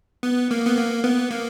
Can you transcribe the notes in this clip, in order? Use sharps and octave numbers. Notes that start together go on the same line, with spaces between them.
B3
A#3
B3
A#3
B3
A#3